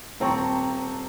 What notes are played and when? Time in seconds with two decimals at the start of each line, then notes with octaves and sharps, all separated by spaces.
0.20 D#1 C4 A5 A#5 C#6